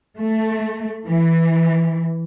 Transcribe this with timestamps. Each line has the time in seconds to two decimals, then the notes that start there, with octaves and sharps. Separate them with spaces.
0.19 A3
1.07 E3